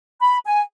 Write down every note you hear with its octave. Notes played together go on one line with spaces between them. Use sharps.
B5
G#5